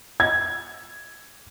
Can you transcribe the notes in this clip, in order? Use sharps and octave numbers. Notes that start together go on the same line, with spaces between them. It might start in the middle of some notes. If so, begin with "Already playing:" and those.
G#6